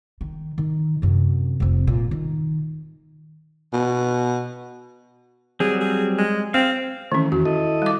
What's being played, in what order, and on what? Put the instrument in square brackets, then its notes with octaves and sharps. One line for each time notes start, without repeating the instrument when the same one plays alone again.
[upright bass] D#3
D#3
F#2 C3
F1 C4
A#2
D#3
[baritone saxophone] B2
[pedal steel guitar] F#3 G3 C4 [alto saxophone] G#4
[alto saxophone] G#4
G#3
[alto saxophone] C4 [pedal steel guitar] F5
[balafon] D#3 C#4 [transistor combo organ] E3 A3
[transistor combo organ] E2 [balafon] F#4
[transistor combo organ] E4 A4 D#5
[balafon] G3 D6